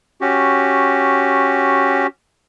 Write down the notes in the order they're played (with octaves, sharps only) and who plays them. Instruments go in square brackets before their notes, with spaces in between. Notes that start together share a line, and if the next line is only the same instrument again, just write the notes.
[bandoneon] C#4 F#4 G4